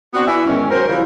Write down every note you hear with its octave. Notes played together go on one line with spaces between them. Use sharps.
B3 C4 D4 F#4
E3 E5
E2 G#2 D#3 C#4
F#3 A#4 C5
C#3 E3 F3 G3 E4 F5